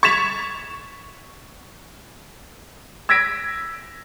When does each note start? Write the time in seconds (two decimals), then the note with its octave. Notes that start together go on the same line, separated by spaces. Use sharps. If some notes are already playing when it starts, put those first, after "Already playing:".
0.03 C#6 G#6 A6 B6 E7 F7
3.09 E6 G#6 A#6 B6 D7